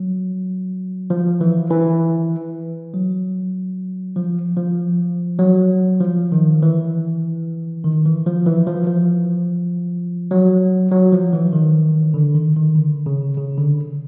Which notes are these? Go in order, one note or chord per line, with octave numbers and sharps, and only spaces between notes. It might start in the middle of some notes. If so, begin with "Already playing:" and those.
Already playing: F#3
F3
E3
E3
F#3
F3
F3
F#3
F3
D#3
E3
D#3
E3
F3
E3
F3
F3
F#3
F#3
F3
E3
D#3
D3
D#3
D#3
D3
C#3
C#3
D3